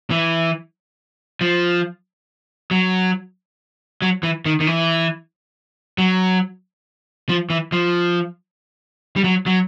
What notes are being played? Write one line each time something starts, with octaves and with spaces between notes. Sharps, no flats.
E3
F3
F#3
F#3
E3
D#3
D#3
E3
F#3
F3
E3
F3
G3
F#3
F#3